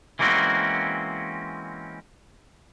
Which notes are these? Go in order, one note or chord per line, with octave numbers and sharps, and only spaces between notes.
E3 G#3 A#3 C4 C#4 F#4